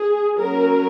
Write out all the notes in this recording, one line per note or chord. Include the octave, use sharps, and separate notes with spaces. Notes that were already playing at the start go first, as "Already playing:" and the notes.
Already playing: G#4
F#3 A#3 C#4 A#4